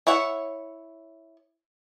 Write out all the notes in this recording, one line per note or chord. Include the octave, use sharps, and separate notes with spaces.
E4 C#5 E5 F#5